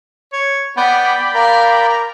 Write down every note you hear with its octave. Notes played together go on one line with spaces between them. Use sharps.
C#5
B3 D5 G5 B5
A#4 F5